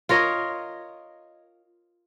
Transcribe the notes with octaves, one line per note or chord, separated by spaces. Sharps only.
F4 A#4 C#5 D#5